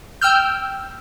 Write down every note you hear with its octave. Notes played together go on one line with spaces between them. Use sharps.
G5 E6 F6 G6